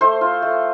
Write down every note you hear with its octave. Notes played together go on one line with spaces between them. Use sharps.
A3 C5
F4
A3